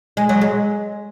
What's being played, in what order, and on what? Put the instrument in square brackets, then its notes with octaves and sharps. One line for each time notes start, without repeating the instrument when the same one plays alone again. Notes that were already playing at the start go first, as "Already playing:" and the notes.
[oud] G#3
F#3
G#3